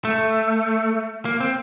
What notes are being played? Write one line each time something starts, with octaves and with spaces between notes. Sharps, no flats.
A3
A#3
C4